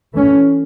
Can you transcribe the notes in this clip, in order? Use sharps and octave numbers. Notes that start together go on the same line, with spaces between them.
E3 A3 C#4